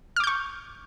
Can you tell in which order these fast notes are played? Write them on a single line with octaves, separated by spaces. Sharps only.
F6 D6 G6 C#6